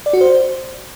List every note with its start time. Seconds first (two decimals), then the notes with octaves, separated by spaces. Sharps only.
0.06 D5
0.13 F#4
0.21 C5